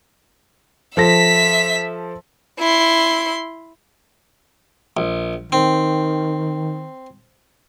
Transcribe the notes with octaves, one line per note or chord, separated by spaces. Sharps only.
F3 A4 E5 A#6 B6
E4 C6
A#1
D#3 C4